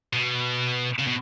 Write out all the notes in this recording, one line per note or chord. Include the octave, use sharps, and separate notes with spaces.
B2
C#3
B2